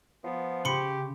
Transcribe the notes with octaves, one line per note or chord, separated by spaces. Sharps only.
F3 B3
C#3 G4 B5 C6 C#7